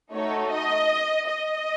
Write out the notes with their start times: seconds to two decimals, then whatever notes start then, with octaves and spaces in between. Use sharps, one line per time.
0.12 A3 D#4 F#4 A4 C#5
0.51 D#5
1.27 D#5